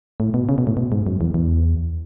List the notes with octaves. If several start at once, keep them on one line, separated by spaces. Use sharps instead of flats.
A2
B2
C#3
B2
A2
B2
G#2
F#2
E2
E2